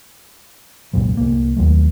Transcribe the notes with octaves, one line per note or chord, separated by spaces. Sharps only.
C2 F#2 A#2 F#3
C2 A#3
D#2 F#3 A3